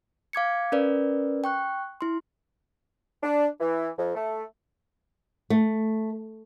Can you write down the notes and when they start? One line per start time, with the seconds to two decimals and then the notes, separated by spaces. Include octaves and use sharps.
0.33 F5 D6 G#6 C#7
0.72 C#4 A#4 B4 D5
1.44 G5 C#6 F#6
2.01 E4 C6
3.23 D4
3.61 E3
3.98 F2
4.15 A3
5.50 A3